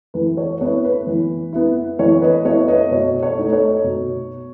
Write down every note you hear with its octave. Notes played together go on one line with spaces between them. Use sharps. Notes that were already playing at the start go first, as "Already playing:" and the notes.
E3 B4
C#5
B3 E4 C#5
B4
E3
B3 E4
E3 C#5
B4 D#5
B3 E4 C#5
B4 D#5
B2 C#5
C#5
A3 D#4
C#5
B2